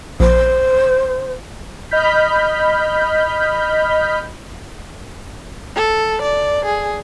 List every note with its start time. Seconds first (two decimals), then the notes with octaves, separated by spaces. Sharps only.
0.20 A#1 C5
1.91 D#5 B5 F6 G6 B6
5.76 A4
6.22 D5
6.65 G#4